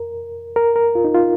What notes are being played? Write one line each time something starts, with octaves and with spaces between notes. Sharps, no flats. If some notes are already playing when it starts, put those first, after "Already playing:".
Already playing: A#4
A#4
A#4
F4
D#4
F4